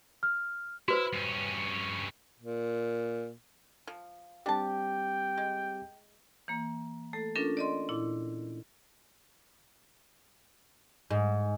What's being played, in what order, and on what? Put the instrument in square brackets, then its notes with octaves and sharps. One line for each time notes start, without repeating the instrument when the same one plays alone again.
[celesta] F6
[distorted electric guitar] E4 [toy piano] F#4 B4 C5
[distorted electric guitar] G2 C#4
[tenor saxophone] A#2
[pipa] F3
[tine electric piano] G3 C4 G4 [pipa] D4 A5 [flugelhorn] G5
[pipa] G#3
[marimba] E3 A#3
A3 A4
C#4 D4 F4 A4 A#4
D5 D#5 C6
A#2 E4
[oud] G#2